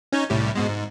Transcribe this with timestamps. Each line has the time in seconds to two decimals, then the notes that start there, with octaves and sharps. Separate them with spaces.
0.13 C#4 D#4 C#5
0.30 C2 A2 G3
0.55 G#2 B2 G#3
0.69 G#2